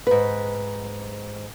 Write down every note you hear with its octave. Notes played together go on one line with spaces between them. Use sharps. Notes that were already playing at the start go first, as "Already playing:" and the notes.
G#2 B4